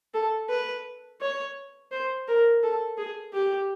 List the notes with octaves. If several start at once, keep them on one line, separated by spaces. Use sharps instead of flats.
A4
B4
C#5
C5
A#4
A4
G#4
G4